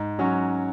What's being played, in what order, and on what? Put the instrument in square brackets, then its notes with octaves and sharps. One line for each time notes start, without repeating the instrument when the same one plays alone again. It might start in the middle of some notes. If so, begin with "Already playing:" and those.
Already playing: [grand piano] G#2
F#3 C#4 F#4